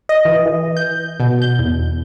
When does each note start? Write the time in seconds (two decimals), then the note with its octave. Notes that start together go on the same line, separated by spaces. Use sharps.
0.09 D#5
0.25 E3
0.46 E3
0.77 G6
1.20 B2
1.42 G6
1.59 E2